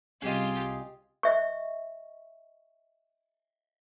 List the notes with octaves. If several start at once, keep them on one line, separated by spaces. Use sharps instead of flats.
C2 G3 C4 C#4 F4 G4 G#4 D#5
D#5 E5 C#6